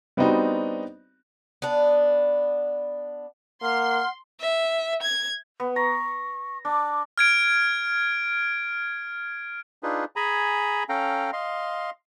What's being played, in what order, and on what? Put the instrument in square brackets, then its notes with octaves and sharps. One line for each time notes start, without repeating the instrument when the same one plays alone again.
[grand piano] G3 B3 C4 D4 D#4 F#4
[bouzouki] B3 D4
[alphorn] A#3 [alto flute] F#5 [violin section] C6 [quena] F6
[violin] E5
G#6
[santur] B3
[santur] A#5 [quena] C#6
[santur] D4 [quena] D6
[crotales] F6 G#6 D7
[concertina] D4 D#4 F4 G#4 B4
G#4 G#5 A#5 B5
C#4 A4 F5 G5 A#5
D#5 F5 C6